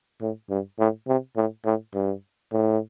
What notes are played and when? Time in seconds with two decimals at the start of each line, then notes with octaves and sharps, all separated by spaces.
0.21 A2
0.50 G2
0.79 A2
1.07 C3
1.37 A2
1.65 A2
1.94 G2
2.52 A2